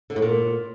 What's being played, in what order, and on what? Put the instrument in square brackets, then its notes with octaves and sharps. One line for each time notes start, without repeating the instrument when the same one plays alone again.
[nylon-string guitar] D3
A2
A#2